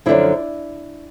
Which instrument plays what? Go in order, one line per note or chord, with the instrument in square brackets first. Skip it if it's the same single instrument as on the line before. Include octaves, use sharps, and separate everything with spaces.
[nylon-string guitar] F#2 D3 F3 D4 E4